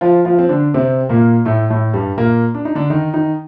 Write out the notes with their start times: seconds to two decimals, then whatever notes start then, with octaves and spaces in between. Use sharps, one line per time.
0.01 F3 F4
0.25 F3 F4
0.39 C4
0.49 D3 D4
0.74 C3 C4
1.09 A#2 A#3
1.45 A2 A3
1.70 A2 A3
1.94 G2 G3
2.17 A#2 A#3
2.55 D4
2.65 D#4
2.75 D3 D4
2.90 D#3 D#4
3.14 D#3 D#4